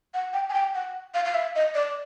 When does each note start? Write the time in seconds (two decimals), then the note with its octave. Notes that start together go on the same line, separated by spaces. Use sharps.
0.14 F#5
0.33 G5
0.49 G#5
0.53 G5
0.74 F#5
1.14 F5
1.25 F5
1.34 E5
1.56 D#5
1.75 D5